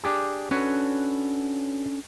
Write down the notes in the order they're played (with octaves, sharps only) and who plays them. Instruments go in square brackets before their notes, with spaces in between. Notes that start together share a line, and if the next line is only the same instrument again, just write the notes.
[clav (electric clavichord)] D4 G4 G#4
[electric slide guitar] C#4 D4 A4 [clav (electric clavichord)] F#4 B4 C#5